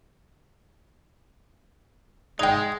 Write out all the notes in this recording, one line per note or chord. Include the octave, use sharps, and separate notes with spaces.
G#3 D#4 G5